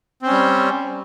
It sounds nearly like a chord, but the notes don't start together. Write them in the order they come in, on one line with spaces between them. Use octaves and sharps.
C4 C#4 G3